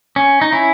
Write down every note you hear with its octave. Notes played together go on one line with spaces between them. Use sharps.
C#4
D#4
C#4 E4